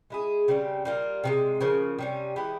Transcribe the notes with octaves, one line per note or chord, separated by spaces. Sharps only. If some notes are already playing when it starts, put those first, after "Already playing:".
G#3 E4 G#4
C#3 G3 C4 G4
G3 A#3 F4
C3 E3 G#3
C#3 F3 A#3
C3 G3 C#4
E3 G#3 E4 G4